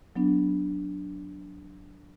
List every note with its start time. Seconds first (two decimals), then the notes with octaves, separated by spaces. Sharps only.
0.16 F#3 B3 D4